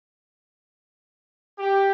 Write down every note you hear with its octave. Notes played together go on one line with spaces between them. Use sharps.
G4